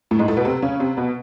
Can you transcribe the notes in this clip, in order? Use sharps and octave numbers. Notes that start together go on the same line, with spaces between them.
A2 A3
G#2 G#3
A2 A3
B2 B3
C3 C4
C#3 C#4
C3 C4
B2 B3